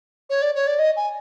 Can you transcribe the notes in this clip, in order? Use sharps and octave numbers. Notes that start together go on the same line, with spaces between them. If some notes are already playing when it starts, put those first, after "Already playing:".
C#5
D5
C#5
D5
D#5
G#5